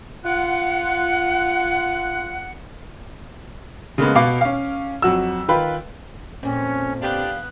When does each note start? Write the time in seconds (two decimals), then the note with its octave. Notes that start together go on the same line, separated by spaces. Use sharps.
0.25 F4 F#5
3.98 C#3 G#3 A#3 B3
4.15 B2 B3 F5 D6 C7
4.41 C#4 F5
5.02 F2 F#3 F#4 E6
5.48 D#3 F4 B4 G5 B5
6.43 F2 A#2 C#4
7.01 B3 D4 G4 F5 F#6